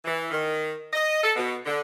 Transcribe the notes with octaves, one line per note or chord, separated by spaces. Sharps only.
E3
D#3
D#5
A4
B2
D3